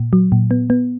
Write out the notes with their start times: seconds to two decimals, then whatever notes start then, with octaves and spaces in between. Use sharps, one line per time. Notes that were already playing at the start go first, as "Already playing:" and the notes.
Already playing: A#2
0.13 F#3
0.32 A#2
0.51 B3
0.70 B3